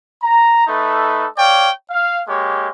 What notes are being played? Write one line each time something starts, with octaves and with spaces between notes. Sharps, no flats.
A#5
A3 D#4 A4 B4
C#5 D5 F5 G5
F5
G#3 A#3 G4 C#5